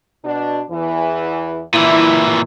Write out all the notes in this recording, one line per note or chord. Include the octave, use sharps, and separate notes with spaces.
B2 D4
E2 E3
A#2 E3 E4